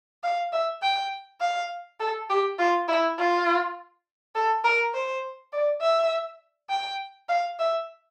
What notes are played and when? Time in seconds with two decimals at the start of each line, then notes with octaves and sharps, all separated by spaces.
0.23 F5
0.53 E5
0.82 G5
1.41 F5
2.00 A4
2.30 G4
2.59 F4
2.88 E4
3.18 F4
4.35 A4
4.64 A#4
4.94 C5
5.53 D5
5.82 E5
6.70 G5
7.29 F5
7.59 E5